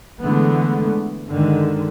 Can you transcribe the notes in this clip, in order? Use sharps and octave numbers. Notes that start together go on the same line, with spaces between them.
D3 E3 G#3 A3 B3
G2 D3 D#3 G#3